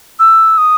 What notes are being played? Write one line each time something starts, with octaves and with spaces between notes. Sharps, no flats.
E6
D#6